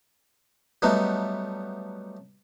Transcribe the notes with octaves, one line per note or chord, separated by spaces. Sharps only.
F#3 G3 A3 B3 D#4